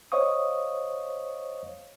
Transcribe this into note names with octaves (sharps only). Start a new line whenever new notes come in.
C5 C#5 D#5 F5 C#6 D#6